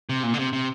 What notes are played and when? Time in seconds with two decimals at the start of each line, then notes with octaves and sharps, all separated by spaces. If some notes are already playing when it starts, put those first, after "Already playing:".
0.09 C3
0.23 A#2
0.34 D3
0.39 C3
0.53 C3